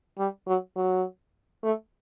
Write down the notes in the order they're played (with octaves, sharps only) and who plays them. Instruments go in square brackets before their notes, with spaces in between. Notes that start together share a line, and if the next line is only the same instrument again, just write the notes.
[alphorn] G3
F#3
F#3
A3